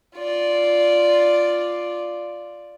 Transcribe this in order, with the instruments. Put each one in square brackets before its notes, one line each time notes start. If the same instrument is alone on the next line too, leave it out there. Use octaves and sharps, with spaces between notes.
[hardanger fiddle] F4 D5